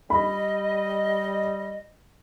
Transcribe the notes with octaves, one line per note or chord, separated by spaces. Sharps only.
G3 D#5 B5